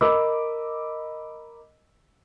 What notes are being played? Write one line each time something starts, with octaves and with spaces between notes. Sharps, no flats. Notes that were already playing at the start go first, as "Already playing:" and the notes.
A#4 D#5 B5 D6 E6